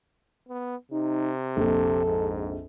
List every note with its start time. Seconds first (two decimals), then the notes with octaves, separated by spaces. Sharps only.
0.49 B3
0.92 C3 D#4
1.57 A#1 F2 A4
2.06 G#2